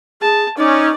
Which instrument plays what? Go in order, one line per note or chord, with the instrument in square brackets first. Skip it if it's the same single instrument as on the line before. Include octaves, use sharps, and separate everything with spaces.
[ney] G#4 [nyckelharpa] A5
[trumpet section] C#4 [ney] D#4 [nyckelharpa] D5